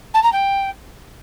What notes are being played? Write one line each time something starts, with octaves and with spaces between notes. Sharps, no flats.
A5
A#5
G5